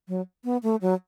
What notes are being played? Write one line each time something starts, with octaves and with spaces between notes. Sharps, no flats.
F#3
B3
A3
F#3